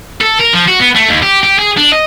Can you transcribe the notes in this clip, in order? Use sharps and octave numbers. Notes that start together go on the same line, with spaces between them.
A4
A#4
F3
F#4
B3
A3
D#2
G4
G4
G#4
D4
D#5